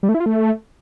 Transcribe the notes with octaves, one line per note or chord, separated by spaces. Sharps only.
G3
A3
E4
F4
A3